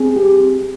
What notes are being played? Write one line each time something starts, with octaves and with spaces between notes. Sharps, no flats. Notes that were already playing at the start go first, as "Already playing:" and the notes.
Already playing: C4 G#4
G4
C4